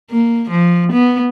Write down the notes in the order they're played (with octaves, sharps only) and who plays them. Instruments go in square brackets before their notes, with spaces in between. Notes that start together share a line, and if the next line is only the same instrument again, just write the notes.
[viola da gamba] A#3
F3
B3